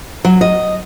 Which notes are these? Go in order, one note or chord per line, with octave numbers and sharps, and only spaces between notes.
F#3
D#5